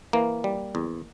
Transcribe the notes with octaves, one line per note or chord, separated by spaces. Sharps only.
E3 A#3
G3
E2